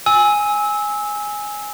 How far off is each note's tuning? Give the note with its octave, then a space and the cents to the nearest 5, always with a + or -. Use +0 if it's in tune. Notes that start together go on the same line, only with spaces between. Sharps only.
G#5 -5 E6 -20